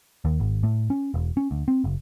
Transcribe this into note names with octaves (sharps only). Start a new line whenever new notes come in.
D#2
G#1
A2
C#4
E1
C#4
D2
C4
F#1